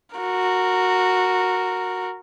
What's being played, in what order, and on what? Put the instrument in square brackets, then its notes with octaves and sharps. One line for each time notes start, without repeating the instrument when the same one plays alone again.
[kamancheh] F#4 A#4